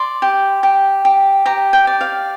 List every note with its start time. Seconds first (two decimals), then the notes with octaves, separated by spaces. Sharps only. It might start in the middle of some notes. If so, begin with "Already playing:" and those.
Already playing: D5 C6
0.22 G4
0.63 G4
1.05 G4
1.46 G4 A#5
1.73 G5
1.87 D5
2.01 F5